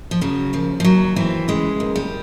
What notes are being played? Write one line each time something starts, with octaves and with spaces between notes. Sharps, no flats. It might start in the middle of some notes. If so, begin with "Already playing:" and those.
F3
C#3 F#3
D#2 F3
F3
D#2 F#3
E3 C4
C#3 G#3
D#2
G3